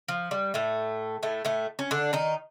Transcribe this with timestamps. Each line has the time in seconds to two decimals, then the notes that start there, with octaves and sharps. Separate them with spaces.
0.08 F3
0.31 G3
0.54 A2 A3
1.23 A2 A3
1.45 A2 A3
1.79 C#4
1.91 D3 D4
2.13 D#3 D#4